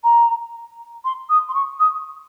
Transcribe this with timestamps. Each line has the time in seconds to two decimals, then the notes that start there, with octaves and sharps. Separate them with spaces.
0.04 A#5
1.05 C6
1.29 D#6
1.49 C6
1.55 C#6
1.80 D#6